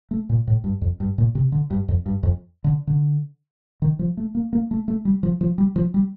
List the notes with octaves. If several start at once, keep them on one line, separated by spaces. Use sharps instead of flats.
A3
A#2
A2
G2
F2
G2
A#2
C3
D3
G2
F2
G2
F2
D3
D3
D#3
F3
A3
A#3
A#3
A3
A3
G3
F3
F3
G3
F3
G3